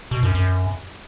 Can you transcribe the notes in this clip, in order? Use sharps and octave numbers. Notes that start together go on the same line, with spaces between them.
B2
F#2
F#2